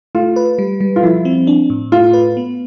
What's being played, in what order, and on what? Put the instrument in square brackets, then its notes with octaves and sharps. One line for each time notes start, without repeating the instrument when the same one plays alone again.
[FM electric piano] A3 [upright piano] F4
[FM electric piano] B4
G3
G3
[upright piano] F4
[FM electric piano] F3 [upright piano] E4
[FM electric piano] C4
D4
A2
[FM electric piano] A3 [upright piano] F4
[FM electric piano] B4
B3